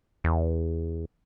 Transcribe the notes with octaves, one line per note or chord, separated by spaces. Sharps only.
E2